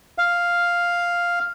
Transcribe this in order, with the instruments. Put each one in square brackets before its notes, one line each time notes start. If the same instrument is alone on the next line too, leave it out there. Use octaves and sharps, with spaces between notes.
[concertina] F5